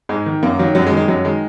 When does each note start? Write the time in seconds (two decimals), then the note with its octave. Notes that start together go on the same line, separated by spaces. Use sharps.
0.09 G#2 G#3
0.26 D#3
0.43 F#2 A#3
0.59 D#3 F#3
0.75 F#2 F#3
0.87 G#3
0.91 D#3
0.97 G#3
1.08 F#2 F#3
1.25 D#3 G#3